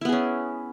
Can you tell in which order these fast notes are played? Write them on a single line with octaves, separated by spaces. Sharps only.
E4 B3 G#4 C#4